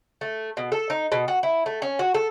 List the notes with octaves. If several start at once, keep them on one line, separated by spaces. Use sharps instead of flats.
A3
B2
A4
D#4
B2
F#4
E4
A3
C#4
F#4
A4